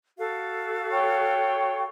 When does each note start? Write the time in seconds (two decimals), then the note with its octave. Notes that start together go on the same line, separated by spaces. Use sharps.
0.18 F#4 A4 F5
0.92 C#5 G5